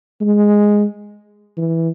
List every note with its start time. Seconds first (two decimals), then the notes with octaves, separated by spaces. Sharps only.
0.21 G#3
1.57 E3